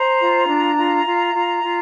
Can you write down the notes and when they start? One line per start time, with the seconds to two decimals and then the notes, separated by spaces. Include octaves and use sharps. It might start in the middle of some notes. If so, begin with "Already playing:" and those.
Already playing: C5 A#5
0.20 F4
0.48 D4
0.78 F4
1.06 F4
1.35 F4
1.64 F4